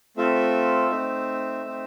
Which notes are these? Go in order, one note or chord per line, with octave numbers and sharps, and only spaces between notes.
A3 C4 F4 A4 E5
A3 C4 D#4
A3 C4 D#4